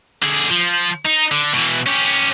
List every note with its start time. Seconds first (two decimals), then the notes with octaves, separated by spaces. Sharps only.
0.23 D3 G#4
0.51 F3
1.05 D#4
1.31 D3
1.54 B2 E3
1.86 C#4 G4